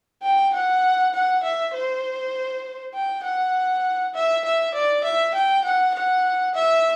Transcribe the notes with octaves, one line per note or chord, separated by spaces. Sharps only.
G5
F#5
F#5
E5
C5
G5
F#5
E5
E5
D5
E5
G5
F#5
F#5
E5